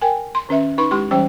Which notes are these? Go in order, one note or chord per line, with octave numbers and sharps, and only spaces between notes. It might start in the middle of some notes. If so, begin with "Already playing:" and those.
A#4 G5 G#5
C6
D#3 C#4 B4 E5
D#4 B4 B5 C#6
G#3 E4 G4 C6
E3 G3 C#4 C5 G5